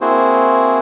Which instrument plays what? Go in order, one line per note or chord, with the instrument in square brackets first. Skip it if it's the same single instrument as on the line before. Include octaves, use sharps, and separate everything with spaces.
[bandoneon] A#3 C4 E4 F#4 G#4 C5